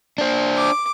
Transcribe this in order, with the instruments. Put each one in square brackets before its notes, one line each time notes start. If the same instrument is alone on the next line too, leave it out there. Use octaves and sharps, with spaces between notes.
[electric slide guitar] D4 C5
[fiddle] D6